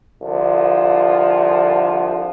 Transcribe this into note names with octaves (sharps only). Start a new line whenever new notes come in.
C2 D3 F3